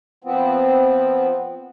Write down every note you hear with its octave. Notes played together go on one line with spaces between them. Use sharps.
F3 B3 C4